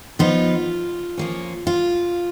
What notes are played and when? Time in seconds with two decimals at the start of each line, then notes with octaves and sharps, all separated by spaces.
0.19 F3 B3 D#4 F4
1.17 F3 A#3 C#4
1.67 F4